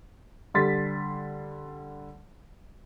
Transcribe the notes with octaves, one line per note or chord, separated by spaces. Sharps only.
D3 G3 C6 A6 B6